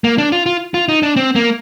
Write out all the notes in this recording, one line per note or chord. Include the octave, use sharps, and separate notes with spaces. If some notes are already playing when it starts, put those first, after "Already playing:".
A#3
D4
F4
F4
F4
D#4
D4
C4
A#3